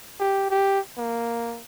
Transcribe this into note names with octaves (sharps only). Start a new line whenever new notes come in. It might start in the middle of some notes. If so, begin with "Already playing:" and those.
G4
G4
A#3